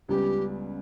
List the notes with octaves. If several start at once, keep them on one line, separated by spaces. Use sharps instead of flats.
C#2 C#3 G3 B3 G4